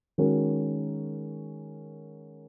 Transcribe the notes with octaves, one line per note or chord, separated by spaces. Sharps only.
D#3 G#3 C#4 F#4 A#4